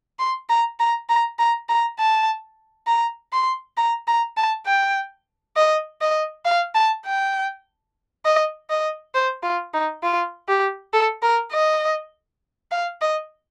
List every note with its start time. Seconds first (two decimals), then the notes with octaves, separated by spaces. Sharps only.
0.19 C6
0.50 A#5
0.80 A#5
1.09 A#5
1.39 A#5
1.69 A#5
1.99 A5
2.87 A#5
3.33 C6
3.77 A#5
4.08 A#5
4.37 A5
4.67 G5
5.57 D#5
6.01 D#5
6.45 F5
6.75 A5
7.06 G5
8.25 D#5
8.70 D#5
9.14 C5
9.43 F4
9.74 D#4
10.03 F4
10.49 G4
10.94 A4
11.23 A#4
11.53 D#5
12.71 F5
13.01 D#5